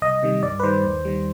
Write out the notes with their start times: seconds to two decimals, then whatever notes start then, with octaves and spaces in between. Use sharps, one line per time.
0.02 C2 D#5
0.23 C3 D#3 G3
0.43 G2 D5
0.60 B4
0.63 D#3 G3 C5
0.84 D#2
1.05 D#3 G3